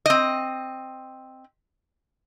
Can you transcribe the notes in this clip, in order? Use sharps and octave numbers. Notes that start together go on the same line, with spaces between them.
C4 D#5